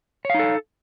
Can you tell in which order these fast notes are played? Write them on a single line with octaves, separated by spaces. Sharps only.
C#5 F5 D#4 A4